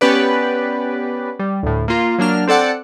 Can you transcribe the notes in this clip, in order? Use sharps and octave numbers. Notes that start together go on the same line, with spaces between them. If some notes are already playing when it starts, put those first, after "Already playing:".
B3 C#4 G4 B4 D5
G3
D2 A2
A#3 F4
F#3 A#3 D4 F6
C4 A4 D5 F#5